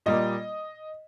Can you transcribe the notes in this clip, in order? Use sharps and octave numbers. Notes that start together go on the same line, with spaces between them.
A#2 G3 A#3 D#5